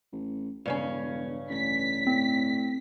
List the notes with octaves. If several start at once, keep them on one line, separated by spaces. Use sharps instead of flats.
A1
E1 G2 C#3 C#4
A1 B6
A2 C4